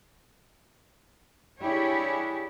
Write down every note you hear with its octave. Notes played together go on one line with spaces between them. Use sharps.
D4 E4 G4 G#4 C#5